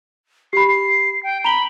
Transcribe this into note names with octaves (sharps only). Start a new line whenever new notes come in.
G4 B5 C7
C7
G5
A#5 B5 F7 G7